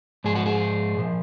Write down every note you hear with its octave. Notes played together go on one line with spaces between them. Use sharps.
G#2 F3 G#4
F#4
G#4
A#2 F3